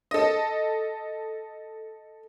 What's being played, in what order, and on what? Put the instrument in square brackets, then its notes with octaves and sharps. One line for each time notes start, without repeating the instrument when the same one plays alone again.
[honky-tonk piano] A4 D#5